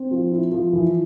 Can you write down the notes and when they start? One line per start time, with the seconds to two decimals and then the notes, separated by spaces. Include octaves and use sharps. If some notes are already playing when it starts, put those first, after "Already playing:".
Already playing: C4
0.11 F3
0.32 E4
0.51 F3
0.73 E3